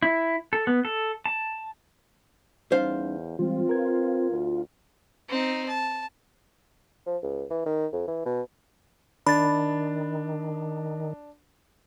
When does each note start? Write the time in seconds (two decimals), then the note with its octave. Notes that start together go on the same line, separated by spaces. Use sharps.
0.02 E4
0.53 A4
0.67 B3
0.85 A4
1.26 A5
2.72 E2 G3 C#4 D#4 C5 F5
3.39 E3 G3 G#3 C4 F4
3.69 A#4 B4 G#6
4.31 D2
5.29 C4 D#4
5.68 A5
7.06 F3
7.23 C#2
7.50 E3
7.66 D#3
7.92 F2
8.07 E3
8.26 B2
9.27 D#3 D4 B5 A6